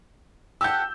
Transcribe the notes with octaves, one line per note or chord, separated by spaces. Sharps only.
G4 A4 F#5 E6 G6